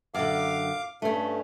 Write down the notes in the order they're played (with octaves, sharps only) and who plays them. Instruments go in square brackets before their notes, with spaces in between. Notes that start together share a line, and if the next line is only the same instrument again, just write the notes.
[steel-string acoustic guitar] F#2 D3 [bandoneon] F5 D6
[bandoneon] G2 [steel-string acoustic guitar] A3 C#4